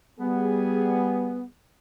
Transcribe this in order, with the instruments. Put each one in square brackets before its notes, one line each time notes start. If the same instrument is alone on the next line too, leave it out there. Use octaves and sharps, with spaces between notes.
[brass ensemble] G3 G#4 [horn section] B3